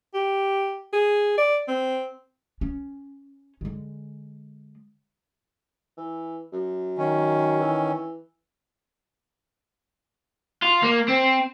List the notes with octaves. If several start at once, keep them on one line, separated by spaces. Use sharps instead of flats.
G4
G#4
D5
C4
C#4
D3 G#3
E3
F#2
D#3 C#4
E3
F4
A#3
C4